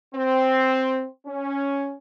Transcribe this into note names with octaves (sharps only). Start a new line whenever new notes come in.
C4
C#4